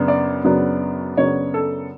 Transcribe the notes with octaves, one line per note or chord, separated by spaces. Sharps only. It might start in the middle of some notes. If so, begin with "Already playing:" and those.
Already playing: F#2 C#3 B3 D4
D5
F#2 C#3 F#3 B3 D4
F#2 C#3 F#3 B3 D4 C#5
A4